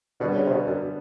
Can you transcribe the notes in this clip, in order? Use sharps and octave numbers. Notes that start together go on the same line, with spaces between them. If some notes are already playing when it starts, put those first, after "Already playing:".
B2 D3 G3 B3 D4
C#3
C3
B2
F#2